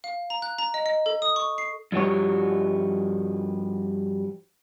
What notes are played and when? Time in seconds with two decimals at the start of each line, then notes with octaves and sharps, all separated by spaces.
0.04 F5
0.30 A#5
0.42 F#6
0.59 A#5
0.74 D#5
0.86 D#5
1.06 A4
1.22 D#6
1.36 C#6
1.58 C7
1.92 G2 F3 G3 F#4 C#5